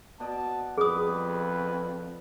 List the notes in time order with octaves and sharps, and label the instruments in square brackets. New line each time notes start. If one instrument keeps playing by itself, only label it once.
[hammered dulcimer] B2 D5 D#5 [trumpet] A5
[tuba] F2 [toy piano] G#4 D#6 [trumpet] B4